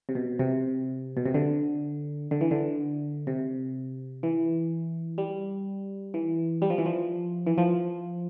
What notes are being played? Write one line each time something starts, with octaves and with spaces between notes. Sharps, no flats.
C3
B2
C3
B2
C3
D3
D3
E3
D3
C3
E3
G3
E3
G3
F3
E3
F3
E3
F3